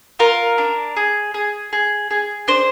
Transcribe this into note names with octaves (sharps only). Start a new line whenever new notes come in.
F4 A#4
D4
G#4
G#4
G#4
G#4
D4 C5